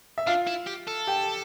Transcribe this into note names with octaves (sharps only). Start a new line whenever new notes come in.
E5
D4 F4 F5
E4
G4
A4
G4 G5